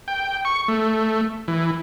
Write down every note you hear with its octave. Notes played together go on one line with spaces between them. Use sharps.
G5
C#6
A3
E3